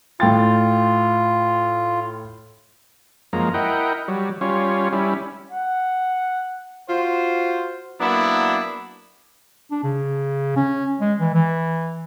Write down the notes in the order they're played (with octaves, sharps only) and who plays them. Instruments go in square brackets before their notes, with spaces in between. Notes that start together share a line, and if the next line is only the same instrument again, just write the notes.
[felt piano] A2 G5 A6 [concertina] F4
[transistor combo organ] F#2 F3 G#3 A#3 A#5
E4 A#4 D#5 F#5 G5
F#3 G3
G3 C#4 F4 C#5
G3 C#4 E4
[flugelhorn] F#5
[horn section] F4 F#4 C5
F#3 A#3 B3 D4 E4
[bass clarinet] D4
C#3
C#4
G#3
E3
E3